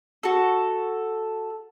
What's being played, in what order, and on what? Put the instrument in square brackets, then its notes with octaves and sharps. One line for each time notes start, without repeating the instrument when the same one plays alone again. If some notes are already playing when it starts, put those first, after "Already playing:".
[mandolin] F#4 A4